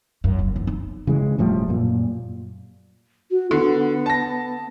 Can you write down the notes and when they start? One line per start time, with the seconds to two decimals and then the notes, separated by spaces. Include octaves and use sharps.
0.24 F#2
0.39 F#1
0.56 E3
0.67 D#4
1.07 C#3 E3 G#3
1.38 E1 A2 F3 G3
1.68 F#2 A#2
3.31 F#4
3.51 D3 B3
4.06 A5 A#6